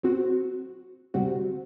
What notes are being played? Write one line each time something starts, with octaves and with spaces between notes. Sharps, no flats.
F#3 C4 F#4
D2 C3 G3 C4 F#4